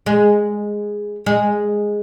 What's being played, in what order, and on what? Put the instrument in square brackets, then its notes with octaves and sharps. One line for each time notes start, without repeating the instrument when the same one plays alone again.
[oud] G#3
G#3